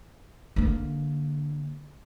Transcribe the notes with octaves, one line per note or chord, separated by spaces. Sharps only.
D3 A#3